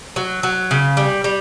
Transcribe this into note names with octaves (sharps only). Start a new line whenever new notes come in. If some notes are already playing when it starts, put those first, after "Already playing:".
F#3
F#3
C#3
G3
G3